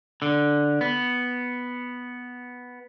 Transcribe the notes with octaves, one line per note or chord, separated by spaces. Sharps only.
D3
B3